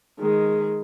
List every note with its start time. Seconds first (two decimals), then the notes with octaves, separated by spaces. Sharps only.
0.19 D#3 G#3